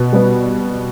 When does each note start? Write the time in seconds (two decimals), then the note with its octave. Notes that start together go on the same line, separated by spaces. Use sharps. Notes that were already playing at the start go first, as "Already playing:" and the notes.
Already playing: B2
0.13 G3 B3